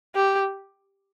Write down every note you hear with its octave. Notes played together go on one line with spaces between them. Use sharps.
G4